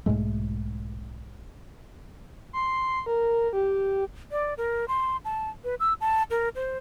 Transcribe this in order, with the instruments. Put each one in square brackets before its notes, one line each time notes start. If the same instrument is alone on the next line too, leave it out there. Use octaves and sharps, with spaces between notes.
[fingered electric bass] B1 G#2 G#3 A3
[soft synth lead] C6
A#4
G4
[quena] D5
A#4
C6
A5
B4
E6
A5
A#4
C5